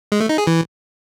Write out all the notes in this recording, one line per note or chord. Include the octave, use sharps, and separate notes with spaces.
G#3
A3
D#4
G#4
E3